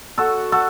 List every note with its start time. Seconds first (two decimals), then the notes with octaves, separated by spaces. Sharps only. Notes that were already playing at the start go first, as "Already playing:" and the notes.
0.18 F#4 A4
0.52 F#4 A4